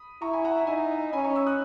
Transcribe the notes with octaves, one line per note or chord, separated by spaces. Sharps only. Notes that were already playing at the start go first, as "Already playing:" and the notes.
Already playing: B5 D#6
E4 A#5 C#6
G#5 B5
F#5 A#5
E5
D#4 E5 G#5
C#4 G#5 B5
A#5 C#6
C#6 E6
D#6 F#6